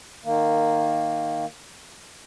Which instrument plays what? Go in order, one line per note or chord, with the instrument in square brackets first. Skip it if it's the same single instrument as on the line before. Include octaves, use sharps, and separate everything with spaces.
[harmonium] D#3 A#3